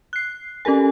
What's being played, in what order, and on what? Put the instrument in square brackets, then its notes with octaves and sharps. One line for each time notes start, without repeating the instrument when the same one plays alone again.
[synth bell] F#6 C7
C#4 G4 A4 A#4 G#5